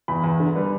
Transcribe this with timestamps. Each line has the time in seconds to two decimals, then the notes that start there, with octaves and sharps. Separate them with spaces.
0.08 E2 B5
0.24 E2
0.40 D3
0.55 G3 B4